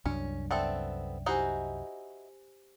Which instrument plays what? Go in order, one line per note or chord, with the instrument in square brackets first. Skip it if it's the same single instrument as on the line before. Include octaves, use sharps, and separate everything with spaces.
[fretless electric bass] C2 F#2 D4 [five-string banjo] C#4
[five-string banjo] B3 C4 A4 [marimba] D5 E5 G5
[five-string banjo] D#4 E4 F#4 [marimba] G4 C5 G#5